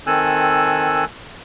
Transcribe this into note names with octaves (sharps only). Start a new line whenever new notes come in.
D#3 C4 A4 G#5 E6 F#6